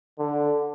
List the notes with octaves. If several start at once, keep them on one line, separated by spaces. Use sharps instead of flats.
D3